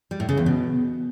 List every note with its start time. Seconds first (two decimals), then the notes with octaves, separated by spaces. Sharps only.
0.11 G3
0.20 A2
0.29 C#3
0.37 E2
0.46 B2